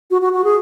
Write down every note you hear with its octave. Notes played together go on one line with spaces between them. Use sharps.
F#4
F#4
F#4
G#4